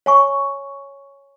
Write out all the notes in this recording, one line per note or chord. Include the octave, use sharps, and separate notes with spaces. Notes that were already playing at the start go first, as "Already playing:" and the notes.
C#5 G#5 C#6